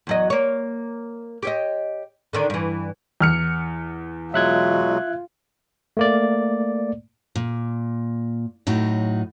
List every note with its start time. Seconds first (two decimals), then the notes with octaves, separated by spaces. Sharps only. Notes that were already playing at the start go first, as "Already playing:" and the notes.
0.07 E2 F#3 D#5
0.30 A#3 C#5
1.43 G4 C#5 D#5
2.33 D3 D#3 D4
2.50 G2 E3
3.21 E2 F6 C#7
4.34 B2 F#3 G#3 F4 E5 F#6 G#6
5.97 A3 A#3 D5
7.36 A#2
8.67 A2 F#3 D#4 F#4